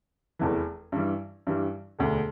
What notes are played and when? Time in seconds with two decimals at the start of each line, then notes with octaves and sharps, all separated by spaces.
0.39 F1 E2 E3
0.92 G2 E3 G3
1.47 G2 E3 G3
1.99 E1 D2 D3